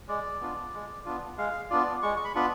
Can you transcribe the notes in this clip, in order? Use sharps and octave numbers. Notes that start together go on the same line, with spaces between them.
G#3 D5
B3 D4 F4
G#3
B3 D4 F4
G#3 F5
B3 D4 F4 D5
G#3 C#6
C#6
B5
B3 D4 F4 B5